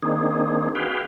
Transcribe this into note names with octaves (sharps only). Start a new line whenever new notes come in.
D#3 A#3 C4 D4 D#4 G#4
F#4 G#4 B4 F5 G5